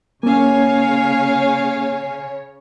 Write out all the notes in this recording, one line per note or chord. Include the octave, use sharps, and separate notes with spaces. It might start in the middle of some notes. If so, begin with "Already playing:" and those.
C#3 A#3 C#4 C#5 F5 G#5